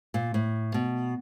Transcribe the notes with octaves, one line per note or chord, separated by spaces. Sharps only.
A#2
A2
B2